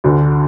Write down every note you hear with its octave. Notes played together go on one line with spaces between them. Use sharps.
D2 D3